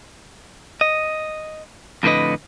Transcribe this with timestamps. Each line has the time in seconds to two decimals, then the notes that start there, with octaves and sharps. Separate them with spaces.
0.81 D#5
2.03 F2 A2 D3 B4 D#5